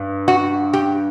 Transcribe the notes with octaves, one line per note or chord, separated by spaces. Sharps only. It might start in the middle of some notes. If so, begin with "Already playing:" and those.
Already playing: G2
F#4
G4